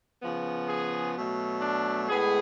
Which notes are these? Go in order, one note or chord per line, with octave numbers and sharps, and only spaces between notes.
C#3 F3 B3
G#4
B2 F#3 A3
D4
A2 G#3 B3 G#4